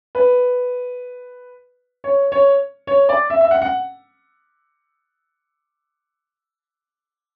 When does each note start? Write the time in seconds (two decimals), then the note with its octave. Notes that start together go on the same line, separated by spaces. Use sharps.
0.15 B4
2.04 C#5
2.32 C#5
2.87 C#5
3.09 D5
3.30 E5
3.41 E5
3.51 F#5
3.62 F#5